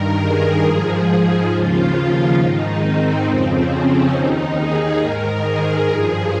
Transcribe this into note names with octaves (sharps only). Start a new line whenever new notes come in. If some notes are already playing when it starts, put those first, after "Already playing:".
Already playing: G2 D#3 A#4
G#4
G#2 F3
D#2 C#3 F3 F4
G#2 D#3 D#4
C4
F2 C#3 F3
C#4
D#2 D#3 D#4
G#4
G#2 D#3 A#4
G#4
G2 F3